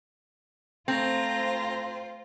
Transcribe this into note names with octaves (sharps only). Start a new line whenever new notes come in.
A3 C4 F4 C5 A#5